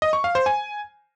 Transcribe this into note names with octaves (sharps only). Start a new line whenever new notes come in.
D#5
C#6
F5
C5
G#5